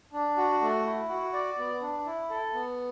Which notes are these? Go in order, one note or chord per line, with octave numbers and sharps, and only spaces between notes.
D4
F#4
A3
E4
F#4
D5
B3
D4
E4
A4
B3